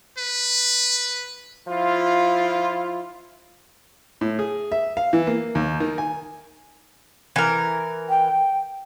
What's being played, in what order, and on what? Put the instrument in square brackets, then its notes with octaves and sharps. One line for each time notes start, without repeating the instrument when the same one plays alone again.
[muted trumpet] B4
[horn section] F3 E4 F4
[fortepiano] A2
G#4
E5
F5
E3
A#3
D#2
D#3
G#5
[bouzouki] E3 A#4
[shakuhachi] G5